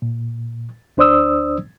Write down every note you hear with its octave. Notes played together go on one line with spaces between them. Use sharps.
A#2
D2 D4 C5 D5 D#6 E6